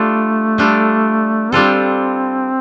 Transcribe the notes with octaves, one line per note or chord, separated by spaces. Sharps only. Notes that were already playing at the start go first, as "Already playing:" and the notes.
Already playing: G3 A3 D4 F4 A4
G3 D4 F4 A4
G3 C4 D4 F4 A4